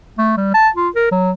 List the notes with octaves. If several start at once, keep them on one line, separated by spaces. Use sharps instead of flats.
A3
G3
A5
F4
A#4
F#3